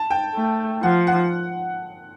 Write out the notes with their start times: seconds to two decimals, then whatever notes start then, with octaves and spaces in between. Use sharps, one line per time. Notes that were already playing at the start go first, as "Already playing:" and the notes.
Already playing: A5
0.10 G5
0.34 A3
0.82 F3 F#5
1.07 F#5